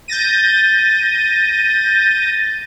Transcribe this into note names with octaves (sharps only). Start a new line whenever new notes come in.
G6 A6 A#6 D#7